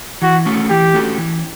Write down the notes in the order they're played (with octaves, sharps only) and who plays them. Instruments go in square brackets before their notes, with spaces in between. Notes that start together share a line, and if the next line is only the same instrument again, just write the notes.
[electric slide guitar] E3 [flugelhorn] F#4
[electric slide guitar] A3 C#4 F#4 A4
[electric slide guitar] E3 [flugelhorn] G4
[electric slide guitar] A3 C#4 F#4 A4
E3